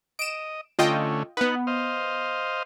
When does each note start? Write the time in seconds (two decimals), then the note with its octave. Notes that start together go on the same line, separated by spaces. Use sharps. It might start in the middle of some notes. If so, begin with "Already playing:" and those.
0.19 D#5 D7 E7
0.79 D3 A3 C#4 F4 D#5 G5
1.37 B3 D#4 B4 F#5
1.67 C5 D#5 F5